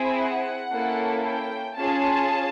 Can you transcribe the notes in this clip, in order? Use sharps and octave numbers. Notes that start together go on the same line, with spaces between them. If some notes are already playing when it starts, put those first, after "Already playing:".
Already playing: C4 E4 G#4
F#5
A#3 C#4 E4 A4
G5
C#4 F4 G#4 A5